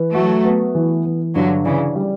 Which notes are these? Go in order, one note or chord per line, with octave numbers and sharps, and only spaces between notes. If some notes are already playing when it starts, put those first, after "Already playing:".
Already playing: E3 B4
F#3 A3 F#4
B3
E3
E3
G2 D3 F#3
C#3 E3 D4
G3